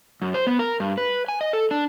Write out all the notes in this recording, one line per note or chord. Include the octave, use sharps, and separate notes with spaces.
F#2
C5
B3
A#4
G2
B4
G#5
D#5
A4
D4